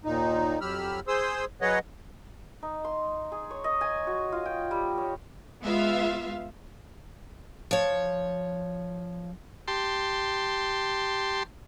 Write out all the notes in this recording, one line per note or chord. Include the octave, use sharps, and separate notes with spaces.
D#2 A#2 D#4
F2 F#3 G4 B5 E6 F6
G#4 C5 C6 D#6 E6
F#3 G#4 B4 C#5 D#5 F#5
D#4
C6
G#4
C#5
D#5
G#5
F#4
F4
G5
G3
C#5
G#3 B3 F4 E5 F5
F3 C#5
G4 A5 C6